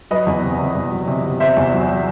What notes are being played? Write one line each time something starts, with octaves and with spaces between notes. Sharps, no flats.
F#3 B4 D#5
E2
C3
C3
E2
F#3
C3
C3
C3 C5 E5
E2
F#3
F#3